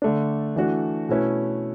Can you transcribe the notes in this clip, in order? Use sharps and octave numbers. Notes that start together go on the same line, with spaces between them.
D3 A3 D4
E3 A3 D4 F#4
B2 A3 C#4 E4 B4